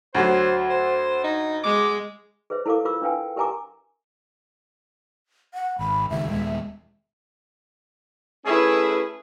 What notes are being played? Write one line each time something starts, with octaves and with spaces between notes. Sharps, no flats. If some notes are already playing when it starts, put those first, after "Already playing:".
D2 F#3 C5
C5
D#4
G#3 D6
G#4 B4 C5 E5
E4 A4 A#4 F5 D6
F4 A#4 D6 E6
D4 B4 F5 G5 G#5
G4 A#4 E5 G#5 A#5 D6
F#5
G#1 B5
G1 C#2 D#3 E5
D#1 G#3
A3 C#4 E4 G#4 B4